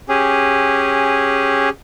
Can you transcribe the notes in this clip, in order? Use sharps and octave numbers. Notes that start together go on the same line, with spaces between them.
C#4 G4 G#4